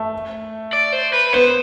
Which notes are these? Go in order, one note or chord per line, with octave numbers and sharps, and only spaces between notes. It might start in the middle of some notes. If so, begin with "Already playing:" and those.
Already playing: A3
D5
C5
B4
B3 C5